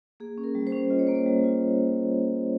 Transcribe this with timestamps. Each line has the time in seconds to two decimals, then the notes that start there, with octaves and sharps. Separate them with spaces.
0.20 A#3 G#4
0.38 C#4
0.44 A#4
0.55 G3
0.67 C5
0.73 C#4
0.90 F4 D#5
0.99 C#5
1.07 A#3 C5
1.15 C#5
1.26 G3
1.44 F4